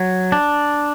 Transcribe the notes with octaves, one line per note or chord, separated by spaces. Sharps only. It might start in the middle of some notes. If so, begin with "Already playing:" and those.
Already playing: F#3
D4